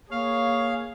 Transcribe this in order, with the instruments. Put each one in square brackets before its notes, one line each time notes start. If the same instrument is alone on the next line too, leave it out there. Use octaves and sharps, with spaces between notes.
[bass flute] A#3 [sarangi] G#4 [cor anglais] C#5 [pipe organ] F5